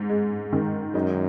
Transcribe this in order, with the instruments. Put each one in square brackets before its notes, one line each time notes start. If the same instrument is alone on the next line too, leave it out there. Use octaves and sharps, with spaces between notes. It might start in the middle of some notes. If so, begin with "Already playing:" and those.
Already playing: [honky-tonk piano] G#2
G#3
D#3
[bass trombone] F#2 [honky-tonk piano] D#4